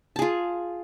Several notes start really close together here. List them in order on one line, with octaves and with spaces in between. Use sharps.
A5 G#4 F4